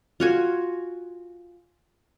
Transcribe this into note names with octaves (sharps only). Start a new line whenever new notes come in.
F4 F#4 G#5